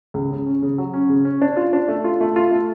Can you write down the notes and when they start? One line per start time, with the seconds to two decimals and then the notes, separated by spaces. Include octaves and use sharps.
0.14 C#2
0.31 C#3
0.46 C#4
0.62 C#3
0.78 F#3
0.94 C#4
1.09 C#3
1.25 C#4
1.42 D4
1.57 F4
1.73 D4
1.88 A3
2.04 F4
2.21 A3
2.36 F4
2.51 A3